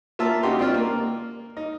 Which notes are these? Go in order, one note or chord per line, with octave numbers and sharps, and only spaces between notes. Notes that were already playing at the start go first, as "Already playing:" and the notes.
A#3 F4 E5 A5
C#3 D#4 F#4 G4 C6
C4 D4 F4
A#3
D#4